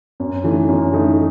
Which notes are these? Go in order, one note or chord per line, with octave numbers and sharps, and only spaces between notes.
F#2
E3 A3 D#4
F#2
E3 A3 D#4